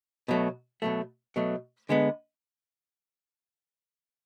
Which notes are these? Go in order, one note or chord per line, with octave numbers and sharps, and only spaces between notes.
B2 F#3 A3
B2 F#3 A3
B2 F#3 A3
D3 G#3 B3